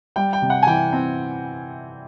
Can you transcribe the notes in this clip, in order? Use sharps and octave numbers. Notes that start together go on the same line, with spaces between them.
G3 G5
G5
C3
F#5
G#5
E3 G5
C4